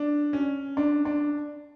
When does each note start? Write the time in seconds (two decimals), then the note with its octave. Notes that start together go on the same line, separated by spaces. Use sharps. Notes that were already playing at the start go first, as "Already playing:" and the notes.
Already playing: D4
0.33 C#4
0.77 D4
1.05 D4